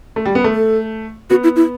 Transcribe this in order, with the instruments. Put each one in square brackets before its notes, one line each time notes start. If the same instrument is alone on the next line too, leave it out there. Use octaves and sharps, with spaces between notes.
[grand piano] A3
G3
B3
A3
[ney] A4
[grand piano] B3 [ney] F#4
[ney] E4
E4